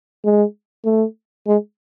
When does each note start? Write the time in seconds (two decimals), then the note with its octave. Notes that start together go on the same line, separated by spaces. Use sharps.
0.25 G#3
0.86 A3
1.47 G#3